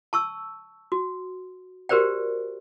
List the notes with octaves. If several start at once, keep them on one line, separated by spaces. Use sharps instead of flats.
A5 C#6 E6
F#4
F#4 G4 A#4 C5 D5 G5